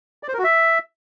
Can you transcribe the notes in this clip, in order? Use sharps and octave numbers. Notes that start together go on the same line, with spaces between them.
D5
C5
A#4
F#4
E5